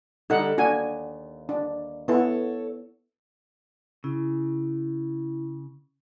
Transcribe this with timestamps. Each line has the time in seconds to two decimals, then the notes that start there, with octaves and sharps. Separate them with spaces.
0.30 D3 G3 D#4 A4 F#5
0.58 D#2 D4 F#4 G#5
1.49 D4
2.08 B3 E4 A4 C#5
4.04 C#3 E4